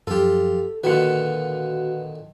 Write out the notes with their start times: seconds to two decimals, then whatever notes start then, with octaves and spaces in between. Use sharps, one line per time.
0.07 F#2 F3 F4 G4 A4
0.84 A#2 D3 D#3 F#4 B4 F#5